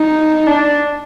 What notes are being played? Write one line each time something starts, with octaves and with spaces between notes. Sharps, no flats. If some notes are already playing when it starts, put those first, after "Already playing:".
Already playing: D#4
D4